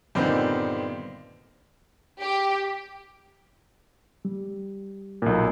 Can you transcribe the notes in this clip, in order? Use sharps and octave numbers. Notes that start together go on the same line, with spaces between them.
G2 A#2 D3 D#3 B3 C4
G4
G3
B1 A#2